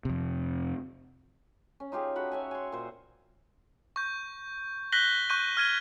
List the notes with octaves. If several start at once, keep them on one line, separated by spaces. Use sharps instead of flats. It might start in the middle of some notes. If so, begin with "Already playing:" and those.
F2 C3
C#4
D#4 F4 G4 G#4
F#4 A4 F#5 B5
C#5 E5 G#5
G#5 C6
A#2 C5
C#6 G6
F#6 G6 A#6 B6 F#7 G7
C#6 F#6 G6 D#7
F6 G#6 D#7